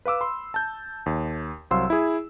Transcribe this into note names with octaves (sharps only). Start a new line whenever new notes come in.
B4 F5 D6 E6
B5 C6
A5 G6
D#2
C2 F#3 C5 F5 C6 E6
E4 G#4